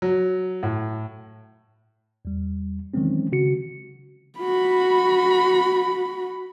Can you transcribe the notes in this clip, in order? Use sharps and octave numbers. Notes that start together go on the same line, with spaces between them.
F#3
A2
E2 G3
D#3 E3 F#3 G#3 C4 C#4
C#3 F#4 C#7
F#4 B5